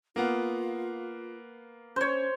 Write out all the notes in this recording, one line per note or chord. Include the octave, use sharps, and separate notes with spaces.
A#3 B3 F4 F5
C#4 C5 C#5